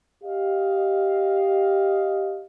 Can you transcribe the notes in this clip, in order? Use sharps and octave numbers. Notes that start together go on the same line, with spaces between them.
G4 D#5 F5